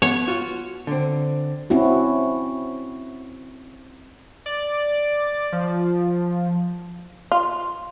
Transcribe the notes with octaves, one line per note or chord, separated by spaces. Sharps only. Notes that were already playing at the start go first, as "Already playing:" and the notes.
B3 C#5
F4 F#4
D3 C4
C4 C#4 E4 F#4
D5
F3
F4